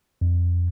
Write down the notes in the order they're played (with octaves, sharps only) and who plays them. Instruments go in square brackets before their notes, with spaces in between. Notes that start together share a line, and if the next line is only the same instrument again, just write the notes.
[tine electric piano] F2